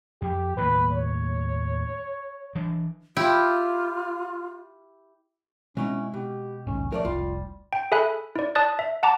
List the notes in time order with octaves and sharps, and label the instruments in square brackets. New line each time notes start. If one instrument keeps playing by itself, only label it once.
[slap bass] F2 [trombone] G4
[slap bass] D#2 A2 A#3 [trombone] B4
[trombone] C#5
[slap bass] E3 D4
[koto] E4 G4 [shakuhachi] F4
[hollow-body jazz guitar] B2 D#4 E4 [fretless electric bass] G#3 C4 [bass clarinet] C#4
[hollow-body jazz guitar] B2 [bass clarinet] G4
[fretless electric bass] A#1 D#2 G#2 [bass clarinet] C#4
[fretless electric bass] F3 [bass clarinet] A3 [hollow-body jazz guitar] A#4 C#5 D5
[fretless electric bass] F1 C2 [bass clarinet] G3 [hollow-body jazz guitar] F4
[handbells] G5
G#4 A4 E5 G#5 B5 F#6
E4 D5
D5 A5 D#6 F#6 A6
E5
F#5 A5 A#5 D6